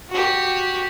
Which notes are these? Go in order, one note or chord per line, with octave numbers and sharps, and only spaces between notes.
F#4 G4